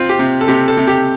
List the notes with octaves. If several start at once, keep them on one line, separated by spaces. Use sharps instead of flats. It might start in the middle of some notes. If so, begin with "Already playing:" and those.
Already playing: C4 F4
G4
C3
A4
C3 G4
A4
C3
G4